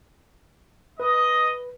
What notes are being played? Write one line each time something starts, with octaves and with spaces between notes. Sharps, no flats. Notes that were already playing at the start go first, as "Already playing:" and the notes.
B4 D#5